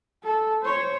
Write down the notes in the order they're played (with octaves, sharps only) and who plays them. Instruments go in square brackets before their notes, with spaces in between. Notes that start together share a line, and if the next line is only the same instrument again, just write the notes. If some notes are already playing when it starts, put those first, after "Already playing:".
[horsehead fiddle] A4
C5 C#5